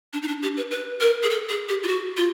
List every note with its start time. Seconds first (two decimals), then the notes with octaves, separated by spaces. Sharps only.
0.13 D4
0.22 D#4
0.28 D4
0.43 G4
0.57 B4
0.71 B4
1.01 A#4
1.23 G#4
1.30 A4
1.49 G#4
1.69 G4
1.83 F4
1.88 F#4
2.17 F4